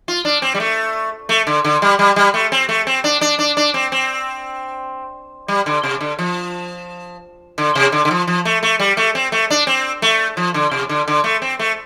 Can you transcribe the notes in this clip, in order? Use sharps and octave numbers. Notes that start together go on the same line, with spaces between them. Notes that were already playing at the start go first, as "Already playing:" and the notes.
F4
D4
C4
G3
A3
A3
D3
D3
G3
G3
G3
A3
C4
A3
C4
D4
D4
D4
D4
C4
C4
G3
D3
C3
D3
F3
D3
C3
D3
D3
F3
F3
A3
A3
G3
A3
C4
A3
D4
C4
A3
F3
D3
C3
D3
D3
A3
C4
A3